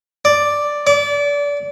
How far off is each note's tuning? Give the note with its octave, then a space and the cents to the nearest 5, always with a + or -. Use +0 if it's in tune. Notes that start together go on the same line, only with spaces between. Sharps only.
D5 +0
D5 -30